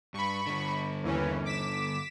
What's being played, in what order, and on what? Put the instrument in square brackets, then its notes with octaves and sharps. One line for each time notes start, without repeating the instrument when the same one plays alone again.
[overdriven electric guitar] G2 [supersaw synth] B5 C#6
[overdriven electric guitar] G2 D3
[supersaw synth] D#2 E3 C#4
D6 B6 E7